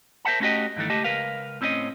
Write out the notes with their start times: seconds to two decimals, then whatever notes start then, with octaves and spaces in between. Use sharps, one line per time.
0.25 A#4 C5 E5 F#5 A5
0.40 A3 C#4 E4 F#4 G4 D#5
0.76 G2 D#3 E3 A3
0.90 C#2 A3 G4 D#5 A5
1.04 C#2 A#4 B4 F5
1.61 A2 C4 C#4 E4 D#5